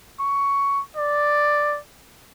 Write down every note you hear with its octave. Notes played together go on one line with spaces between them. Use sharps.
C#6
D5